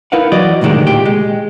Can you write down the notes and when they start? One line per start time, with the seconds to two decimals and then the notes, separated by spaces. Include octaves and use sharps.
0.12 D#4 E4 A#4 B4 F5 F#5
0.32 E3 F#3 F#4 D5 D#5
0.61 D2 A2 C3 D#3 G#3 D4
0.87 A#2 G4
1.05 G#3